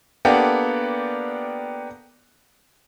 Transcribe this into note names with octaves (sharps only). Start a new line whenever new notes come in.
A#3 B3 D4 G4 A4 F#5